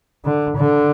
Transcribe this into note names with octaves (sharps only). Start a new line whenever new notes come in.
D3
D3